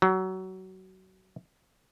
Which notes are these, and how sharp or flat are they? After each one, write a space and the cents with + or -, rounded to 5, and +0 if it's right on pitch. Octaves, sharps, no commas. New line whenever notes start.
F#3 +25